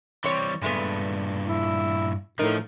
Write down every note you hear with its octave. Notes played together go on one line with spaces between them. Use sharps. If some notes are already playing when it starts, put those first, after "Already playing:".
E3 G3 C4 C#5
G2 A#2 G#3 A3 B3
E4
A2 F3 D#4 A#4